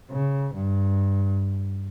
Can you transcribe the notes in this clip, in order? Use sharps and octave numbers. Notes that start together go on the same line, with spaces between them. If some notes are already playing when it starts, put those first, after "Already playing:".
C#3
G2